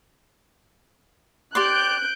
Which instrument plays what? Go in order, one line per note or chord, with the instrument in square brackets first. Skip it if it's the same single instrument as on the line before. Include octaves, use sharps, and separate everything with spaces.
[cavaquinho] G4 D5 C6 [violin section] F#6 G6 D7